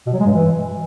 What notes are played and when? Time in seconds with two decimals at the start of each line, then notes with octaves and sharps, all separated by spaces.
0.06 B2
0.13 F#3
0.20 G#3
0.26 G2
0.33 E3